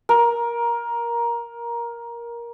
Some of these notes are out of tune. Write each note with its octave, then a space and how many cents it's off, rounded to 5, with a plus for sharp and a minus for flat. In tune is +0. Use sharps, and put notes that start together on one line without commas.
A#4 +15